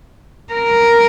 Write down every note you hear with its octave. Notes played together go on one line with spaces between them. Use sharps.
A#4